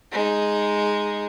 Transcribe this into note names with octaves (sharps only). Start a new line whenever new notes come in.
G#3 D#4